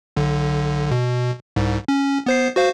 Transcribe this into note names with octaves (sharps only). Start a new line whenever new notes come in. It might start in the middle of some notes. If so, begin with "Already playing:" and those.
B1 D3
B2
C2 G#2
C#4
B3 C5 C7
F#4 C5 F5